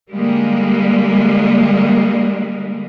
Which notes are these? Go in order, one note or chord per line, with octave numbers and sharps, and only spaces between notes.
D3 G3 G#3 A#3